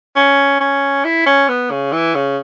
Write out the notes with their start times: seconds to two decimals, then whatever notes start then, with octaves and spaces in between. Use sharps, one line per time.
0.15 C#4
0.60 C#4
1.05 E4
1.26 C#4
1.48 B3
1.71 C#3
1.92 E3
2.15 C#3